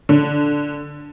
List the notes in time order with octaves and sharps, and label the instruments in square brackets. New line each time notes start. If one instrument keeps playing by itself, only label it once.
[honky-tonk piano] D3